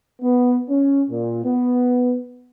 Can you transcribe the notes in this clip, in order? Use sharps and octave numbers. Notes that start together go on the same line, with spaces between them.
B3
C#4
A#2
B3